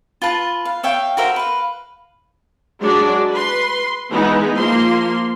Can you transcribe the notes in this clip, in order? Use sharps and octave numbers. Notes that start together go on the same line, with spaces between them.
F4 B4 A5
F5
C#5 E5 F5 G5
F#4 A#4 C5 E5
B4 F5
F#3 G#3 D4 F#4 D5
B4 C6
E3 G#3 B3 D#4
F3 A#3 C6